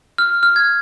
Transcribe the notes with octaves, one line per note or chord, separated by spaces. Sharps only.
F6
F6
G#6